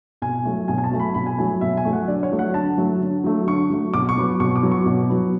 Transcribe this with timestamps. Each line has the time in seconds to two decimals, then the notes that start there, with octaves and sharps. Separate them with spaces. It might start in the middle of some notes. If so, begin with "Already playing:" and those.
0.22 B2 G#5
0.45 F#3 A3
0.68 B2 G#5
0.78 G#5
0.84 A5
0.92 F#3 A3
1.00 B5
1.14 B2 B5
1.26 G#5
1.38 F#3 A3 G#5
1.61 B2 E5
1.77 G#5
1.85 F#3 A3
1.93 F#5
2.08 D3 D5
2.23 C#5
2.32 F#3 A3
2.39 F#5
2.54 D3 A5
2.78 F#3 A3
3.01 D3
3.24 F#3 A3
3.47 D3 C#6
3.70 F#3 A3
3.94 B2 D6
4.09 C#6
4.17 F#3 B3
4.40 B2 C#6
4.56 D6
4.63 F#3 B3
4.72 C#6
4.86 B2
5.10 F#3 B3